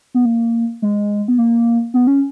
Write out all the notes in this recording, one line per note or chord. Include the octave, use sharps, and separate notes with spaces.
B3
A#3
G#3
B3
A#3
B3
C#4